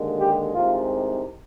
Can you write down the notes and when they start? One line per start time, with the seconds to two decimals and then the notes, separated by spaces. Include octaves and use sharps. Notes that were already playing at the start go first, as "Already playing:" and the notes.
Already playing: D#2 D3 G#3
0.20 G4
0.53 C2 C3 D#3 G#3 F4